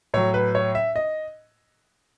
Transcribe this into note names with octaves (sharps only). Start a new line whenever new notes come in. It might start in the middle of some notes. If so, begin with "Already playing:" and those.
A2 F#3 C#5
B4
C#5
E5
D#5